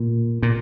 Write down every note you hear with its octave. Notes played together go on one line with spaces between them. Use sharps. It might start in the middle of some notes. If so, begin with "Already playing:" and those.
Already playing: A#2
A#2